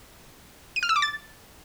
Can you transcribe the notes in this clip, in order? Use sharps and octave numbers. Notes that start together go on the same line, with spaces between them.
D#7
F6
E6
D6
A6